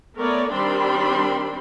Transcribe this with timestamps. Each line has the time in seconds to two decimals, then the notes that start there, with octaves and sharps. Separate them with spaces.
0.16 A3 B3 A#4 C#5 D5
0.52 D#3 G3 C4 D4 B5 C6